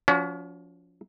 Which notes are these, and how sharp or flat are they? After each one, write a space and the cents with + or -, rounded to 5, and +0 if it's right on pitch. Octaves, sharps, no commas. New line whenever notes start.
F3 +10 C#4 +40 F#4 +0